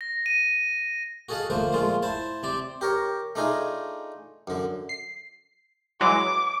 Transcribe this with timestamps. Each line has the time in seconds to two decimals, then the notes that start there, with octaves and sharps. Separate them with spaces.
0.01 A#6
0.26 D#7
1.29 F#4 G#4 A4 D#5 F5 F#5
1.50 D3 F3 A3 A#3 C5
1.72 A#2 F3 G#3 A3 F4
2.02 E4 C5 A5
2.43 C3 C4 D5
2.81 G4 A#4 C#5
3.35 A3 D4 D#4 F4 G#4
4.47 F#2 D3
4.89 C7
6.01 E3 F#3 G#3 D6